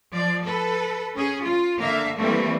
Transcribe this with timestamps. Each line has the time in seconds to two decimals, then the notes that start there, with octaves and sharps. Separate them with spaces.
0.12 F3 D5
0.42 A4 B4
1.14 C#4 G#4
1.43 F4
1.79 D3 A#3 E5 F5
2.18 E3 G3 A3 A#3 C4